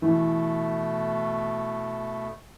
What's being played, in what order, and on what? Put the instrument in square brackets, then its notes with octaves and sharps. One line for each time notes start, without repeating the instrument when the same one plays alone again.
[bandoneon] B2 A3 [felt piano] E3